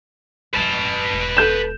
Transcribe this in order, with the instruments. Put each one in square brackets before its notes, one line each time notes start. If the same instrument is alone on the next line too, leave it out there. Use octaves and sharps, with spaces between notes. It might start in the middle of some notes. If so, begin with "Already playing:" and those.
[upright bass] E1 F#2 [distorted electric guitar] B4 A5
[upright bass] E1
[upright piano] A4 G6 E7